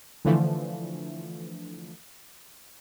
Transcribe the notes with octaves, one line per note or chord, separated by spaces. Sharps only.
D3 E3 F3 A3